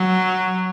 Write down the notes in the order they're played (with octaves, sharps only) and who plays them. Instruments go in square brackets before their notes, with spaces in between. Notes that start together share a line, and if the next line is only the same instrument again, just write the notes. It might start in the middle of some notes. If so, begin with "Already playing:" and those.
Already playing: [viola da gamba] F#3